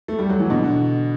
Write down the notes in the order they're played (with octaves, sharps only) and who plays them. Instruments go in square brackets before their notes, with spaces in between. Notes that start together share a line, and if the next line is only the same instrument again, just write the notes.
[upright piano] A3
G3
F#3
E3
B2 D3